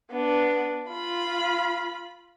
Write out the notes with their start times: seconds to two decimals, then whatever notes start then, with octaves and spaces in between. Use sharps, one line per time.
0.11 B3 D4
0.90 F4 B5